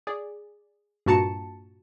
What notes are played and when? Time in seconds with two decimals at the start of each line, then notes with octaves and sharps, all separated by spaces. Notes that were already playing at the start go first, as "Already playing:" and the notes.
0.07 G#4 D5
1.06 G2 A#2 F#4 A5 A#5 C#7